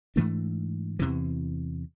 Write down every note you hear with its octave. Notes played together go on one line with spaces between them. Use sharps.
G#2 E3 A3 D4
E2 C3 E3